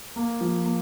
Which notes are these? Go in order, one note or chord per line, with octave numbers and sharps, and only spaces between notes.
A#3
F3
A#3